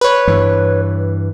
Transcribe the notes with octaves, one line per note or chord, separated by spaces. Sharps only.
B4 C#5
G2 E3